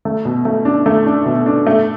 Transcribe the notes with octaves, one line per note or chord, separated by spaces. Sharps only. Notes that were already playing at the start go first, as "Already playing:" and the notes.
A3
B2
A3
D4
A3
D4
B2
D4
A3